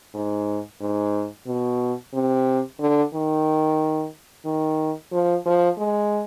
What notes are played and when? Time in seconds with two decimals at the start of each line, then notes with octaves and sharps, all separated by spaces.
0.14 G#2
0.81 G#2
1.47 B2
2.14 C3
2.79 D3
3.14 D#3
4.45 D#3
5.13 F3
5.46 F3
5.78 G#3